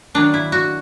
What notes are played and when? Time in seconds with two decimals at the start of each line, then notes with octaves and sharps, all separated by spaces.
0.14 D#3 F#3 A#3 D4
0.34 E4
0.52 F#4